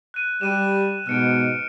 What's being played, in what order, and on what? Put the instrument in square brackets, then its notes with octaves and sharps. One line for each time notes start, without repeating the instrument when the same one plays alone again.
[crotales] F#6 D#7
[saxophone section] G3 [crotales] F#6 D#7 E7
[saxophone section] G#2 B2 [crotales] F6 C#7 D7